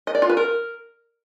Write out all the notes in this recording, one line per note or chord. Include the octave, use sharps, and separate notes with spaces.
D#5
D5
F4
B4
A#4